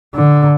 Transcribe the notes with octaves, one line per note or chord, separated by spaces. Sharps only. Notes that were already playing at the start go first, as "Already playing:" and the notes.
D3